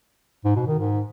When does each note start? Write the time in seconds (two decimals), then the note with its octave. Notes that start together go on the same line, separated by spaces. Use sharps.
0.45 G#2
0.56 B2
0.67 D#3
0.78 G#2